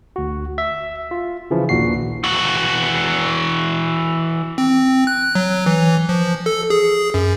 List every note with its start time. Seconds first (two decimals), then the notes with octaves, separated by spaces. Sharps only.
0.16 D2 F#4
0.58 E5
1.11 F4
1.51 C#3 E3 F3 E4
1.69 A#1 D#2 A#2 F#4 C7
2.24 E3 F#4
4.58 C4
5.07 F#6
5.35 F#3
5.66 E3
6.09 F3
6.46 A4
6.70 G#4
7.14 F#2